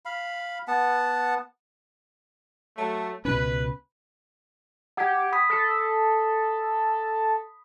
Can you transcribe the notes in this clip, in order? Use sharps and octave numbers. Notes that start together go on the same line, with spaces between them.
F5 B5
B3 F#5 A5
F#3 A3
C#2 B2 C#4 B4
G4 F#5 G#6
B5 D#6 B6
A4